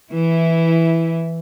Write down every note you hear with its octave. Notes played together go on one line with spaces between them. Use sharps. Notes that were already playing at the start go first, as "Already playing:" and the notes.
E3 E4